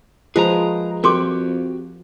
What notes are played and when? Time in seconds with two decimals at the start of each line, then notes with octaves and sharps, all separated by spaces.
0.36 F3 G#3 G#4 A#4 B4 A#5
1.04 F2 F#4 G4 A#4 G5 C6 D6